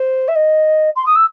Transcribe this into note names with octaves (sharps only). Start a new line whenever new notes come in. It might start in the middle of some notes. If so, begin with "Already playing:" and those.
Already playing: C5
E5
D#5
C6
D#6
E6